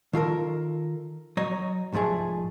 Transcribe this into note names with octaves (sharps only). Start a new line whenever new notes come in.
D#3 F4 A4 A#4
F#3 C#5 D#5 A#5
C2 G#2 F3 A3 G#4